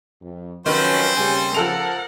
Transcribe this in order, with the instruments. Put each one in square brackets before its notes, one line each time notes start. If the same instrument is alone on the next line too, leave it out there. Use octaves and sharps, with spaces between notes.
[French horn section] F2
[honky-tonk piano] D#3 [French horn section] F3 F#3 C#4 [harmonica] C4 C5 [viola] A4 B4
[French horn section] D#2 C#3 [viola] G3 [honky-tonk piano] G#5
[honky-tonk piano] F3 A4 F7 [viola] A#4 F#5